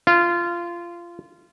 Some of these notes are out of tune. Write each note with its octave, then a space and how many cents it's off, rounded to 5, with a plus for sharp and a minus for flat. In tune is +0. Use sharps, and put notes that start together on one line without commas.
F4 -20